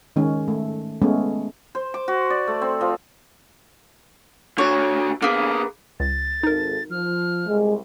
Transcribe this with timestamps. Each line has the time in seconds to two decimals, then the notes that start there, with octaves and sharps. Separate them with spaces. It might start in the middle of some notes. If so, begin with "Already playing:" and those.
0.16 D#3 G#3 C#4 D#4
0.48 A3
1.02 G#3 A3 B3 C#4
1.75 C5
1.94 D6
2.08 F#4
2.30 D5
2.47 A3
2.61 C4
2.81 F3
4.58 D3 F#4 C#5
5.22 D3 A#3 B3 G#4
6.00 C#2 A6
6.43 G#1 D#4 A4 A#4
6.91 F3 F6
7.48 C2 G#3